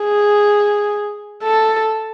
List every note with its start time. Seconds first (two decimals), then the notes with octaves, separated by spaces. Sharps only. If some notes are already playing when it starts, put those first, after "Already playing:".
Already playing: G#4
1.43 A4